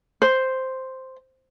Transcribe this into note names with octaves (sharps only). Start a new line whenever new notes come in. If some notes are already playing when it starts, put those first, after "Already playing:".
C5